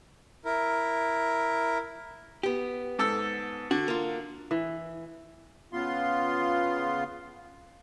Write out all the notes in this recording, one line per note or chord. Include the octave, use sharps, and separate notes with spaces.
E4 A#4
B3 G4
G#2 A4 E6
D3 F#4
A#3 F4
E3
C#3 B3 F4 C6